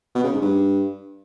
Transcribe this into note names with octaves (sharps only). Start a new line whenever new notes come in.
B2
C#3
G#2
G2